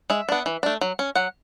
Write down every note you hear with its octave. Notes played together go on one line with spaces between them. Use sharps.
G#3 E5
B3 D4
E3
A3 D4
F#3
C#4
F#3 F#5